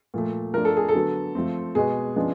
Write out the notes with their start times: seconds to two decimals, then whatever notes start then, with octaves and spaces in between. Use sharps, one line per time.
0.14 A#2 F3 A3
0.54 F3 A3 D4 A#4
0.65 A4
0.77 G#4
0.89 A4
0.95 D3 F#3 B3
1.35 F3 A3 C4
1.75 B2 G#3 B3 G#4
2.16 C#3 F3 G#3 B3 D4